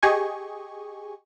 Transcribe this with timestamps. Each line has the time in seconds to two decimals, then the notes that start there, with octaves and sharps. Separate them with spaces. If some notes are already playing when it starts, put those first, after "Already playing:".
0.02 G4 G#4 D#5 G#5 C#6